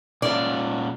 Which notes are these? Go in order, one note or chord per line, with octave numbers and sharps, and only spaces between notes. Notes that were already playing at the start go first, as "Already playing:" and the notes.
A#2 C#4 F4 D5